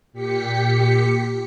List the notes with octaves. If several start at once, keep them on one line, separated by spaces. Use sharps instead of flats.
A#2 G4 B6 C#7